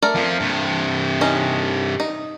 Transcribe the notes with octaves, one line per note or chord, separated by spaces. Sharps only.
A3 A#4 D5
F2 F3
G2 C3
C#4 D#4
D#4